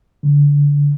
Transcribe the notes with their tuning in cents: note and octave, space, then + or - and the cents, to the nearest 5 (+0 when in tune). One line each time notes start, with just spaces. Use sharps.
D3 -25